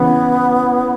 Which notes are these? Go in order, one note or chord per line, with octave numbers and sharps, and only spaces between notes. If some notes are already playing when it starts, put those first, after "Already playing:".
Already playing: C#3 E3 B3